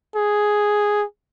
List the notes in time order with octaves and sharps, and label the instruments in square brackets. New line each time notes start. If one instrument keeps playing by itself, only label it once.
[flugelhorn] G#4